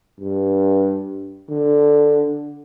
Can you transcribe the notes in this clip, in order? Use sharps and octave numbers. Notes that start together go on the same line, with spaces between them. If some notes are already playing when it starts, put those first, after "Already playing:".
G2
D3